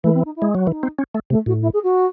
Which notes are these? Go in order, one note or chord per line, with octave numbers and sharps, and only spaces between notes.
E3 A3
C4
D#4
E4
G#3
F#3
E3 D#4
C4
C#4
A3
C3 A3
A2 F#4
E4
G#4
F#4